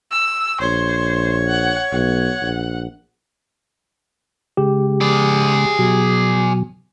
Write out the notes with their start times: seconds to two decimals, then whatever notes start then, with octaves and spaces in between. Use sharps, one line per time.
0.11 E6
0.61 A#1 C5 C#5
1.47 F#5
1.93 B1 F#5
2.42 A#1
4.57 C#3 G#3 G4
5.01 G#4 D5
5.79 B2 F#3